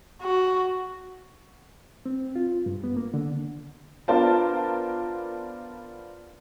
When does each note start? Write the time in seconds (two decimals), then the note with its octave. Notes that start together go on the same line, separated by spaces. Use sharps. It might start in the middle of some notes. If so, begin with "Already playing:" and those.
0.23 F#4
2.06 C4
2.36 F4
2.66 G2
2.84 B3
2.96 A#3
3.14 D3
4.08 B3 D4 F4 A#4 C5 A5